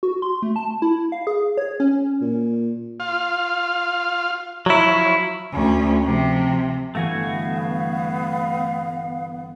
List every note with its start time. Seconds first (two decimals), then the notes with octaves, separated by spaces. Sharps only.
0.03 F#4
0.22 C6
0.42 A3
0.56 A5
0.82 E4
1.12 F5
1.27 G#4
1.58 C#5
1.80 C#4
2.21 A#2
3.00 F4 F5
4.66 F3 F#3 E4 C#5
5.52 D2 C#4
6.03 C3 F3
6.95 G1 E3 A3 B3 F#4 F5 G#5